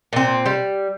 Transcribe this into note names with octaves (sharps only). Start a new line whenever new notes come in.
A#2 C4
G3